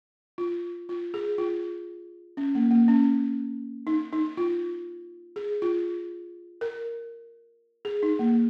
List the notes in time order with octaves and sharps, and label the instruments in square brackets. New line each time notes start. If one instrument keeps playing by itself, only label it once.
[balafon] F4
F4
G#4
F4
C#4
A#3
A#3
C#4
D#4
D#4
F4
G#4
F4
A#4
G#4
D#4
A#3